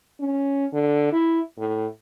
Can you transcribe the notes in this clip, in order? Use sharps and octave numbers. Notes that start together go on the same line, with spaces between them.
C#4
D3
E4
A2